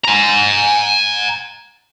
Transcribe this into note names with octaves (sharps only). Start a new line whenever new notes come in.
G#5 A#5